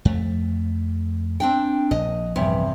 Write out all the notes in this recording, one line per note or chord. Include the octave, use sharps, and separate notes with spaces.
F2 A3
C4 D4 G5
A#1 D#5
E2 G2 C3